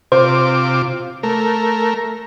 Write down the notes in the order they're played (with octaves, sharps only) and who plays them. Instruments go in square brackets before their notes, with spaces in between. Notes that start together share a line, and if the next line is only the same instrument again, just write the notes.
[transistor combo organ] C3 F4 D6 [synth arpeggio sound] C5
[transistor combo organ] A3 A#4